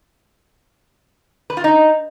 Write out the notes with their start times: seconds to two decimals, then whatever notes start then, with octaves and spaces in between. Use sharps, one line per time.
1.50 B4
1.57 F4
1.64 D#4